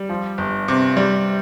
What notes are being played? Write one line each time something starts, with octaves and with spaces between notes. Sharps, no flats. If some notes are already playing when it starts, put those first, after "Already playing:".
Already playing: G3
F3
G1
C3
G3